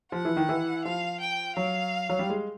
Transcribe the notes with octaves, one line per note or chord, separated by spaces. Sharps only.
F3 F#5
E3
D#3
E3
F3 F5
G5
F#3 F5
F#3
G3
G#3